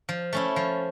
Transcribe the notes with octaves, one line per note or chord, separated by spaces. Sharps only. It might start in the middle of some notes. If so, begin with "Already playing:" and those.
F3
A3 C#4 E4
F3